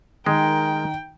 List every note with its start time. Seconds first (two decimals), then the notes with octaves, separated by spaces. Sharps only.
0.26 D#3 G#3 A#4 G5